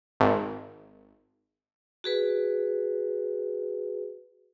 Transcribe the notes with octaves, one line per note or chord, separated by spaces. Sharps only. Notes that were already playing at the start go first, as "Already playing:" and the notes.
G#1
F#4 G#4 B4